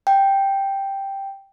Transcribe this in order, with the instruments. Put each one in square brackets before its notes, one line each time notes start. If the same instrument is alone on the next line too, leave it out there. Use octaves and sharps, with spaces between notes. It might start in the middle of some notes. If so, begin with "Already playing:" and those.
[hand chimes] G5